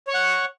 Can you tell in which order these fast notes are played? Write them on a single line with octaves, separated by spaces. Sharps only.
C#5 C#6 F#5